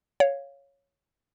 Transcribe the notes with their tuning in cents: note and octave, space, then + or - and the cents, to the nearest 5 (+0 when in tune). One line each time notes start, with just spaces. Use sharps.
C#5 +0 F5 +0